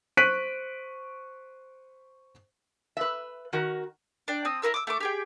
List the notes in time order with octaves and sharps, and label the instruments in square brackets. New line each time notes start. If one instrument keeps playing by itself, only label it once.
[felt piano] C5 C#6 F#6 B6 D7 D#7
[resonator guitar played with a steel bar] B4 E5
D#3 F#4 A#4
[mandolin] D4 G5
C4 D#6
E4 G#4 A#4 E6
D6 E6
A3 A4 D6
G4 G#4 G5